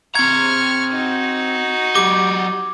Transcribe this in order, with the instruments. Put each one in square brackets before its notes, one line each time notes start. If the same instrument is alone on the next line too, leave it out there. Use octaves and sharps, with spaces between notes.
[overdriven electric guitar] C4 A#5 [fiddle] C#6 F6 [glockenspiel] G#6
[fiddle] D#4 F#4
[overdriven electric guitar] F#3 G4 [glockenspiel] D6